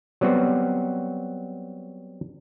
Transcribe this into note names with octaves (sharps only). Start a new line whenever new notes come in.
F#3 G3 B3 C4 F#4